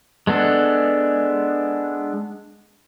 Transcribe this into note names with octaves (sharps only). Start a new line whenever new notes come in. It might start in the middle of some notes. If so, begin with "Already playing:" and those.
G#3 B3 D4 A4